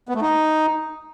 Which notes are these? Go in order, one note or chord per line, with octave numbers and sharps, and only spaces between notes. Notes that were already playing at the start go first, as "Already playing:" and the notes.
B3
A3
D#4